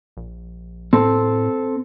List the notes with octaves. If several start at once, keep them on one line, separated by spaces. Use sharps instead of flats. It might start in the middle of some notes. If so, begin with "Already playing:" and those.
A#1
A2 C4 A4